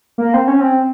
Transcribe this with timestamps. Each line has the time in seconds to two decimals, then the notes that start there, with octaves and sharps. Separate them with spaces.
0.18 A#3
0.34 C4
0.48 C#4
0.61 C4